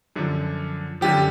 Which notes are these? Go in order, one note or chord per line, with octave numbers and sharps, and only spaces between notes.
F#2 D3 F3
F#2 D3 F3 G4